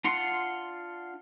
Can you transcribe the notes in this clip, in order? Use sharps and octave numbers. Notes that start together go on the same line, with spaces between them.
D4 F4 F#5 C6